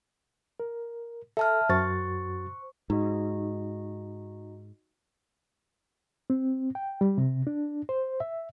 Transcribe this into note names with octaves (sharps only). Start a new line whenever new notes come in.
A#4
A4 E5 A5 F6
F#2 F#4 C5 C#6 A6
G#2 D#4 F#4 D#5
C4
G5
G3
C3
D4
C5
E5